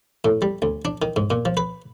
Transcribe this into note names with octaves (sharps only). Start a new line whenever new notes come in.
A2
G3
D2
D4
D#3
G#2
A#2
F3
B4